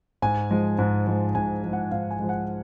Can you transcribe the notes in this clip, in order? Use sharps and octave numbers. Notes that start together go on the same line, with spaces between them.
G#2 G#5
F3 G#3
G#2
F3 G#3
G#2 G#5
F3 G#3
F#5
G#2 F5
G#5
F3 G#3
F#5